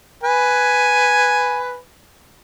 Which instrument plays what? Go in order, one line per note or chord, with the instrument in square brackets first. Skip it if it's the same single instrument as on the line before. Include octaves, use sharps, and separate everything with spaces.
[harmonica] B4 G#5